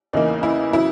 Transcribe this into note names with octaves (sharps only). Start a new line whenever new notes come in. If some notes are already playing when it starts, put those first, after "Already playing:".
E2 C#3 E3 A#3 D#4
E4
C#3 F#3 E4